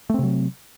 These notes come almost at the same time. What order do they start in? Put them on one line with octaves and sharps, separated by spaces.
A3 C4 C3 F#3